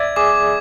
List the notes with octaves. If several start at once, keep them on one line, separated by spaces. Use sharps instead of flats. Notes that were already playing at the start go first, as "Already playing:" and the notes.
Already playing: D5 E5 G#6
G#4 D6